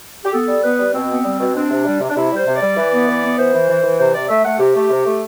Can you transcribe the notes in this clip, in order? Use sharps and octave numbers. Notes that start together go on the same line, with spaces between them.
G4
B3 A4
G3
B3 B4
G3
B2 C4
B3
G3
B2
C4 D4
C3
G3
C3
D4
C3 E4
G3
C5
C3
D5
G3
E3
B3
E3
B3
E3 C5
E3
E3
E3
C3 C5
C3 D5
A3 E5
A3 F#5
C3 G4
A3
C3
A3